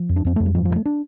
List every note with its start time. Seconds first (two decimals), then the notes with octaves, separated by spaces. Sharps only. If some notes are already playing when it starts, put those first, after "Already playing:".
Already playing: F3
0.09 F2
0.16 D4
0.25 F2 C4
0.36 F2 A3
0.46 G3
0.55 G2 F3
0.65 G2 F3
0.76 A3
0.86 D4